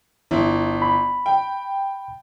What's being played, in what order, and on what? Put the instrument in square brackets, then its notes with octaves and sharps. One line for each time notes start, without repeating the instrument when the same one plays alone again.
[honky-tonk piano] G1 E4
[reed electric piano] B5
[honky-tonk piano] G5